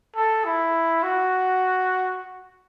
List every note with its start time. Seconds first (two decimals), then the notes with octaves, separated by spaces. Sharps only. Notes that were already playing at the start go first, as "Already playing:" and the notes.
0.16 A4
0.45 E4
1.03 F#4